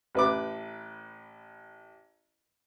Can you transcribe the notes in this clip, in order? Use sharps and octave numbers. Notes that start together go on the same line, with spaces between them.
A1 B4 D6